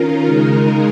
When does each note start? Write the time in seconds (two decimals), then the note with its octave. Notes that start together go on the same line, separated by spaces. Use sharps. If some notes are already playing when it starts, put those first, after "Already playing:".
Already playing: D#3 C#4 F4 A#4
0.26 C#3 G#3 D#4 A#4